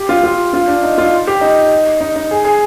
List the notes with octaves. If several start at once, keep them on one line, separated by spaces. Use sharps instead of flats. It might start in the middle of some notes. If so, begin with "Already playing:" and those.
Already playing: G4
F4
F4
F4
D4
D#4
F4
G4
D#4
D#4
D#4
G#4
G#4